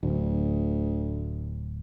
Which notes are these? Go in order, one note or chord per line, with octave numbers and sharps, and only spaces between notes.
D1 D2